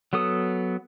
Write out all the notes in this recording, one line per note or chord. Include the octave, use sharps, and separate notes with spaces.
F#3 B3 A4 D#6